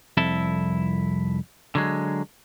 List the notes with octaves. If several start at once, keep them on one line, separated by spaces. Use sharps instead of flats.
C2 F2 E4 A4
D3 F#3 G#3